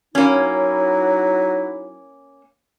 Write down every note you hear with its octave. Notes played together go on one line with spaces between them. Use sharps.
F#3 A#3 C#4 D#4 E4